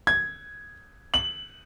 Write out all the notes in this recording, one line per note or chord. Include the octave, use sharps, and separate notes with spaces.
G#6
F#7